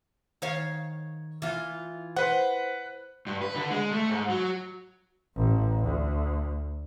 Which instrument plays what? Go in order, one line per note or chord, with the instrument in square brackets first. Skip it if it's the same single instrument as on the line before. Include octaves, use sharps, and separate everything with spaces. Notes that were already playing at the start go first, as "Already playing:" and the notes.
[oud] D#3 C#5 F5
E3 F4
[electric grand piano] B4 F#5 [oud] C5
[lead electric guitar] G2
B4
D3
G#3
A3
G#2
F#3
[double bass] A1
D2